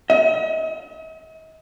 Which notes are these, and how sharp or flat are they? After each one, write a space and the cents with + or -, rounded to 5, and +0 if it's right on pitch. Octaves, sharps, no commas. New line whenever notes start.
D#5 +45